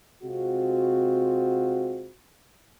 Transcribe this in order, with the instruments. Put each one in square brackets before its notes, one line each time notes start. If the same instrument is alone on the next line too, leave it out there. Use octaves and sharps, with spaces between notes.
[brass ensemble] C3 G#3 C4 F4 F#4